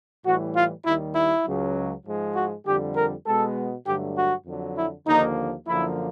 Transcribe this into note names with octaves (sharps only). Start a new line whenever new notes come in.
A2 E3 G3 F#4
F4
D#2 D#3 G3 E4
E4
C#2 C#3 F#3
G#2 F3 G#3
F#4
F2 D3 G3 G4
A#4
B2 G#3 B3 A4
G2 D3 F#3 A3 G4
F#4
F2 D3 F#3
E4
D#2 D3 F3 A#3 D#4
F#2 D3 F3 A#3 E4